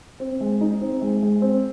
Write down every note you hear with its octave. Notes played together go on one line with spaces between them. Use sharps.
C4
G#3
D#4
C4
G#3
G#3
C4